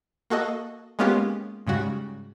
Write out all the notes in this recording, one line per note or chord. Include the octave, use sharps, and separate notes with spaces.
A#3 F#4 A4 D#5
G#3 A#3 B3 C#4 F4 G4
G#2 C#3 G3 F#4